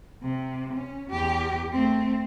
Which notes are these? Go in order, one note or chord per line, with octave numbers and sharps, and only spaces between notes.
C3
C#4
E2 G4
A3 C4